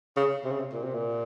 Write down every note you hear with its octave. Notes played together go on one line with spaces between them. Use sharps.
C#3
C3
C#3
C3
A#2
C3
A#2